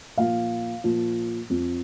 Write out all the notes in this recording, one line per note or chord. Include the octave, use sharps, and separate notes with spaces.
A#2 F3 F5
A#2 F3
F2 F3